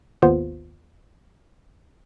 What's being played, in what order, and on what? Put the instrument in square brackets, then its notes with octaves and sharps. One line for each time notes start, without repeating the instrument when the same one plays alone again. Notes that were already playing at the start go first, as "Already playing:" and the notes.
[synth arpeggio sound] G#1 D#2 B3 F4 C5